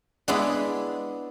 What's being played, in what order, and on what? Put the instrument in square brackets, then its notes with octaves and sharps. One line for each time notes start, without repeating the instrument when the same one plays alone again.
[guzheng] G#3 B3 D4 E4 G#4